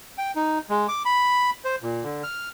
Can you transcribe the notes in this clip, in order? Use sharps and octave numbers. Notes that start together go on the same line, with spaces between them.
G5
D#4
G#3
D6
B5
C5
A#2
D3
F6